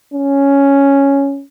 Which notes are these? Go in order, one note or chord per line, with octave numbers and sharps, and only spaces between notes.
C#4